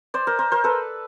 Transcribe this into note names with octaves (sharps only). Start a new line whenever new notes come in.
C5 D5
A#4 C5
A#4 C5
A#4 C5
A4 B4